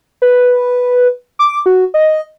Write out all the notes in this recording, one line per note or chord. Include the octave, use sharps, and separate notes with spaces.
B4
D6
F#4
D#5